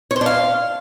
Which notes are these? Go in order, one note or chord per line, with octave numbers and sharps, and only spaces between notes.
C#5
C5
D4
F5